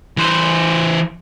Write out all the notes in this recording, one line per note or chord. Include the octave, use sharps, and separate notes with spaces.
E3 C5